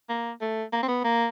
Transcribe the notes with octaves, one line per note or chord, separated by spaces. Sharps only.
A#3
A3
A#3
C4
B3
A#3